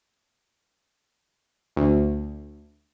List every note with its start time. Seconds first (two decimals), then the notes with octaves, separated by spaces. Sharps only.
1.76 D2